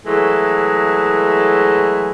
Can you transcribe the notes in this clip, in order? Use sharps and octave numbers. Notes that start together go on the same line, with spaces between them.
E3 F#3 G#3 A3